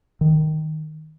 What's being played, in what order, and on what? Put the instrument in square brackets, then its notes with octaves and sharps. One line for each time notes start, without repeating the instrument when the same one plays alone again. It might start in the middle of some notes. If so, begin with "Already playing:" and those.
[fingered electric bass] D#3